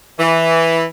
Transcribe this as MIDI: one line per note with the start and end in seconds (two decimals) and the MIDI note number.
0.19 0.84 52